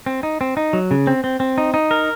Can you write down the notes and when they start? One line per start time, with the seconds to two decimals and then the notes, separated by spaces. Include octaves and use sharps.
0.06 C4
0.23 D#4
0.41 C4
0.57 D#4
0.73 F#3
0.91 C#3
1.07 C4
1.24 C4
1.40 C4
1.58 D#4
1.74 D#4
1.91 A#4